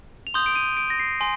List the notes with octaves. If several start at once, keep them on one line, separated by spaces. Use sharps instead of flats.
F7
C6 D#6 G6 G7
D7
D#7
D7
A#6
C7
G#5 C6